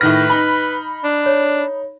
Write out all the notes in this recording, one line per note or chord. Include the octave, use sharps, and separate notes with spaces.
A2 D#3 B4 F6 A#6
D#4 B5
D4
C#5